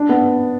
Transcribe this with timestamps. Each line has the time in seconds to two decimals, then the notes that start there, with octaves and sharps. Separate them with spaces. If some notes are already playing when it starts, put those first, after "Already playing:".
Already playing: D4
0.09 B3